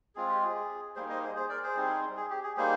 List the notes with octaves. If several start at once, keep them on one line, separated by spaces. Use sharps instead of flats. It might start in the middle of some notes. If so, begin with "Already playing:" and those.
G#3 C4 F4 G#4
G4
G#4
G3 A#3 D#4 G#4 C5
C5 D#5
G#4 C5
G#4 C5
A#4 D5
G#4 C5
G3 C4 D#4
G#4
G4
G#4
G3 A#3 D#4 G#4 C5